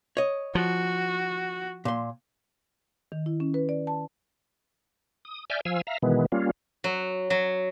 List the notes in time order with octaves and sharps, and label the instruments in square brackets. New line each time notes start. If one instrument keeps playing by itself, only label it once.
[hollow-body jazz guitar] C#5 D#5
[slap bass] F3 [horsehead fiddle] F#4
[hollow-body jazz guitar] A#2 C6
[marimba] D#3
E4
C#4
B4
D5
A5
[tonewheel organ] D#6
D5 E5 G#5 F6 G6
F3 F5 G#5 E6
E5 F5 A#5
B2 D#3 E3 G#3 B3
G3 A#3 C#4 F4
[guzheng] F#3
F#3